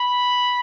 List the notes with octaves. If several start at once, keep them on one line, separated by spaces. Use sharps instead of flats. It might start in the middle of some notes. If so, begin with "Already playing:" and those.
Already playing: B5